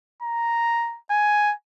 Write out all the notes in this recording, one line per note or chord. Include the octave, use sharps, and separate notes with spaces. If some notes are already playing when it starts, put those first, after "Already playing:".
A#5
G#5